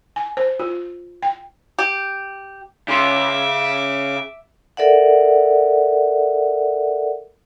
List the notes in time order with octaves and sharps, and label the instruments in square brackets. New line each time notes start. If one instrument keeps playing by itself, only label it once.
[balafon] G#5
C5
F4
G5
[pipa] G4
[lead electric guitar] C#3 C6 [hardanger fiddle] E5 D6
[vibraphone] A4 A#4 D5 E5 F#5